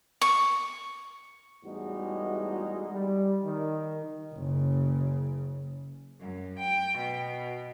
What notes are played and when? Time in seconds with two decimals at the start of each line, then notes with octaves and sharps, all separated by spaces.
0.21 C#6
1.64 E2 A2 G3 G#3 D#4 F#4
2.92 G3
3.44 D#3
4.34 F#1 C#3
6.20 F#2
6.59 G5
6.98 B2